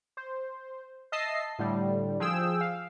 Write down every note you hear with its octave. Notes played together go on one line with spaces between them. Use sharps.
C5
D#5 E5 A5 C7
A2 D3 G3
F3 G#4 G5 E6
F5